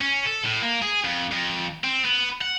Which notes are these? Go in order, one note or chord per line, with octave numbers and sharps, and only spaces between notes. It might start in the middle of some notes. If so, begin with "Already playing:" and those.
C#4
A4
A2
A#3
G#4
F2
F2
C4
B3
F#5